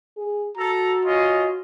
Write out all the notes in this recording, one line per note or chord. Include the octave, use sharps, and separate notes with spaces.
G#4
F#4 A4 A#5
C#4 F4 D#5